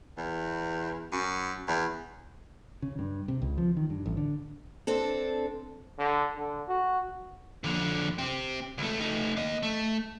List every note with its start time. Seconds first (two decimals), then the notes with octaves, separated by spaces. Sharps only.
0.17 E2
1.12 F#2
1.68 E2
2.82 C#3
2.99 G2
3.28 C3
3.42 C#2
3.58 F3
3.77 D#3
3.90 G2
4.06 A1
4.17 D3
4.87 C4 D4 A4
5.99 D3
6.36 D3
6.68 F#4
7.64 F2 D3
8.18 C4 G4
8.78 C#2 A3
9.00 A3 D#4
9.37 A#3 D#5
9.63 A3